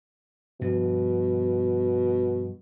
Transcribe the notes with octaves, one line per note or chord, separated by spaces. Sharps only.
G2 B2 F3